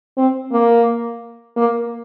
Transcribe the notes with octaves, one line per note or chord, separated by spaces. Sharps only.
C4
A#3
A#3